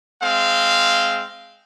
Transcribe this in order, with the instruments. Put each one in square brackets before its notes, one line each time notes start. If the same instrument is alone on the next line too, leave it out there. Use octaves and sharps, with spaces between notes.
[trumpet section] G#3 C4 F5